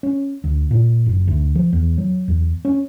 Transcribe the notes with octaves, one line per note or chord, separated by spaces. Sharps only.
C#4
D2
A#2
F#1
D2
F3
E2
F#3
E2
C#4